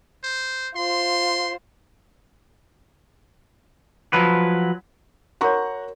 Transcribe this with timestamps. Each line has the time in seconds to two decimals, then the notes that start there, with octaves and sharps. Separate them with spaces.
0.23 C5
0.76 F4 C5 C6
4.13 F3 F#3 B4
5.41 F#4 A#4 C#5 F#5 A#5 C#6